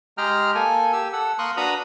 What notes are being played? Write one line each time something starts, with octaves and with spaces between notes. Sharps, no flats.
G#3 G4 G#4 G5 A#5 F6
A#3 A4 G#5
G4 E6
A4 F#5 E6
A#3 A#4 C6 C#6 D#6 F#6
D4 F#4 B4 A#5 B5 D#6